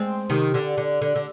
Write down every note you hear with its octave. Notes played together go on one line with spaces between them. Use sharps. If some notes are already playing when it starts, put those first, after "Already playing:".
Already playing: G#3 C4
C3 D#3
D3
D3
D3
D3